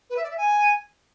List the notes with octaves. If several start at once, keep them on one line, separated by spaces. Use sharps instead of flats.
B4
E5
D5
E5
G#5